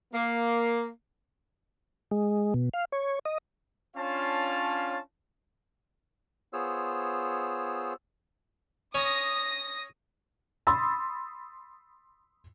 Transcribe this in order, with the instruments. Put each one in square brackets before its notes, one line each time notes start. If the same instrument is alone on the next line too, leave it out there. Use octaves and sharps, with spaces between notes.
[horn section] A#3
[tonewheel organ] G#3
B2
F5
C#5
D#5
[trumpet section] C#4 D4 F4 C#5 F5 A5
[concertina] B3 F4 G#4 C5 C#5 E6
[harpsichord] C#4 [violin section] D#6 A#6
[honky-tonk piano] B5 C6 D#6 E6 A6